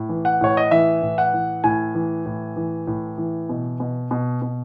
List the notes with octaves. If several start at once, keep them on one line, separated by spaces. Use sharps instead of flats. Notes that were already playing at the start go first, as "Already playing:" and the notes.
Already playing: A2
E3
F#5
A2 C#5
D#5
E3 E5
A2
F#5
E3
A2 G#5
E3
A2
E3
A2
E3
B2
B2
B2
B2